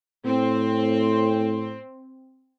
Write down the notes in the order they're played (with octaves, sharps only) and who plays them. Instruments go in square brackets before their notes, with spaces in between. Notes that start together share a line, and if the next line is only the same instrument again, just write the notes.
[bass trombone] A2 [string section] C4